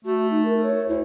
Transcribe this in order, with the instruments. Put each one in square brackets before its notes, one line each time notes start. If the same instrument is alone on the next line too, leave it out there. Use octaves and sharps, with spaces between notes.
[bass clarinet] A3 [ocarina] F#4
[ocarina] D#4
A#4
C#5
[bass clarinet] D2 [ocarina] E4